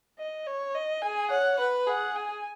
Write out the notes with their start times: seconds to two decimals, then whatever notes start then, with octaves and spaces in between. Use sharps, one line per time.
0.19 D#5
0.47 C#5
0.75 D#5
1.02 G#4 G#5
1.30 C#5 F#5
1.59 B4
1.87 G#4 F#5
2.16 G#5